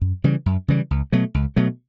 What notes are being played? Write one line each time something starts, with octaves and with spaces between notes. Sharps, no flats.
F#2
C#3 E3 G3
F#2
C#3 E3 G3
C#2
B2 F#3 A3
C#2
B2 F#3 A3